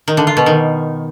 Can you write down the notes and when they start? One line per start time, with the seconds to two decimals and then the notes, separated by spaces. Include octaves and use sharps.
0.08 D#3
0.17 D3
0.27 F4
0.37 B2
0.46 D#3